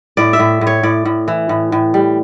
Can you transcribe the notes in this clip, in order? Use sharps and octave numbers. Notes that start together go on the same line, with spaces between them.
A2 D5
E5
A2
A2
C#5
A2 D5
A2
E3
A2
A2
G3